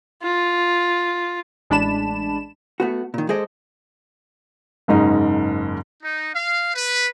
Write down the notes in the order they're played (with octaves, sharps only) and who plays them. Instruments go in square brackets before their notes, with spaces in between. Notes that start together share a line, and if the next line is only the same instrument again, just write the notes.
[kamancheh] F4
[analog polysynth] A1 G#3 D4 A5 B5 E7
[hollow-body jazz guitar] A3 B3 F#4
A#2 D#3
G#3 G#4 A4 C5 D5 D#5
[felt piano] F#1 G#2 D#4
[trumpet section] D#4
F5
B4